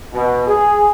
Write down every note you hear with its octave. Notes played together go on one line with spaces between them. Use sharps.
B2
G#4